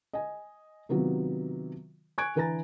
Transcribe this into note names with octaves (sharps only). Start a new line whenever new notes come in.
D#5 G#5
C3 D#3 F#3 B3 F4
G#5 C#6 F#6 G#6 D7
D3 E3 B4 G#5 A#5 A6